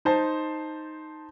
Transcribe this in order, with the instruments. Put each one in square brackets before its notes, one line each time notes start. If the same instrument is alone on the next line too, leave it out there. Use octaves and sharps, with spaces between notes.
[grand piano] D#4 C5 A5 C6